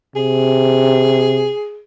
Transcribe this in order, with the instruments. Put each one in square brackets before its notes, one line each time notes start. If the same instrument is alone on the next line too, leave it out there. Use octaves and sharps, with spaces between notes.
[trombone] C3 [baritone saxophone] G#4